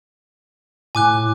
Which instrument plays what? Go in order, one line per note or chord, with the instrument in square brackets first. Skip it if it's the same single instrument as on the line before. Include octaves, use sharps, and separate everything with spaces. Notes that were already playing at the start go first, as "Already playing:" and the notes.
[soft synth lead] A2 [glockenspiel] G#5 D6 F#6